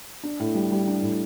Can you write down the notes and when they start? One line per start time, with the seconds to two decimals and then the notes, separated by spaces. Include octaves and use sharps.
0.23 D4
0.40 A2
0.55 G3
0.72 G3
0.88 D4
1.02 A2